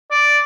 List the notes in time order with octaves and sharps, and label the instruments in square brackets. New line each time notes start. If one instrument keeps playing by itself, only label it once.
[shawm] D5